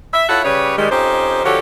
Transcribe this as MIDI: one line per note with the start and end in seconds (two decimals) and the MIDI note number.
0.13 0.27 76
0.28 0.43 64
0.28 0.43 65
0.28 0.43 69
0.28 0.43 73
0.28 0.43 76
0.28 0.43 78
0.43 0.75 49
0.43 0.75 55
0.43 0.75 67
0.43 0.75 71
0.43 0.75 73
0.77 0.90 51
0.77 0.90 55
0.77 0.90 56
0.90 1.41 41
0.90 1.41 61
0.90 1.41 63
0.90 1.41 67
0.90 1.41 72
1.44 1.59 50
1.44 1.59 53
1.44 1.59 66
1.44 1.59 67
1.44 1.59 69
1.44 1.59 73